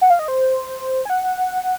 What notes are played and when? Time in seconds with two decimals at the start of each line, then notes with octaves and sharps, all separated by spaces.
0.01 F#5
0.10 F5
0.19 D#5
0.28 C5
1.05 G#5
1.10 F#5